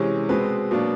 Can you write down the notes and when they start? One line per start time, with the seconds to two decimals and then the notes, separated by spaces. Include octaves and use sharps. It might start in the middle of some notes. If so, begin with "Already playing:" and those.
Already playing: C3 E3 G#3 C#4
0.29 B2 G#3 C4 B4
0.71 B2 F#3 A#3 D4